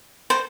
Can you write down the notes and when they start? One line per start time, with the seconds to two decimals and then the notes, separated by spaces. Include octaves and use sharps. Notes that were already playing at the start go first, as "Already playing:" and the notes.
0.30 C5